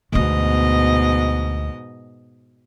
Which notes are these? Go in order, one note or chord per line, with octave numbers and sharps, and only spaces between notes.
D2 G#2 B2 B3 D#5